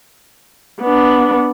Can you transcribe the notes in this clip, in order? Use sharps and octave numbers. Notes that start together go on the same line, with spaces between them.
B3 D4